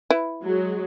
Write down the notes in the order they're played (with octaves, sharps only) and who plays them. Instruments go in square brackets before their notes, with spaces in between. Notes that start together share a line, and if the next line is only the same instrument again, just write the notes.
[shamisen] E4 B4
[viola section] F#3 G#3